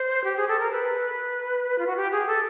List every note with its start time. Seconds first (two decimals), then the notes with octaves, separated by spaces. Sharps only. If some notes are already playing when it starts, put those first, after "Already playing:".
Already playing: C5
0.24 G4
0.37 G#4
0.48 A4
0.59 A#4
0.71 B4
1.79 F4
1.87 F#4
1.96 G4
2.12 G#4
2.27 A4